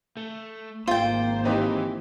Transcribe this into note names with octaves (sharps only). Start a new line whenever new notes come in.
A3
G#1 A#3 F4 C5 G5
E3 C4 D#4 G4